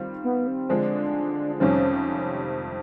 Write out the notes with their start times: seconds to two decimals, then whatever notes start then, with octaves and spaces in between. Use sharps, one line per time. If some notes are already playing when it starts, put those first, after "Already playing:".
Already playing: D#3 G3 C4 F4
0.24 B3
0.47 C4
0.69 D3 F3 G#3 C4 D4
1.60 F2 C3 D#3 G3 C4 C#4